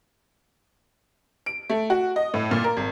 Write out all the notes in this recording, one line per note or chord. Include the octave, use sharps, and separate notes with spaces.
D7
A3
F#4
D#5
A2
A#2
A#4
G#1